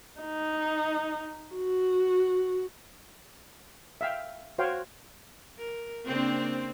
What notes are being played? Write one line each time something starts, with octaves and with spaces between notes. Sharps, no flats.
D#4
F#4
E5 F5 G5
F#4 C5 C#5 F5 G5
A#4
C#3 A#3 C4 D4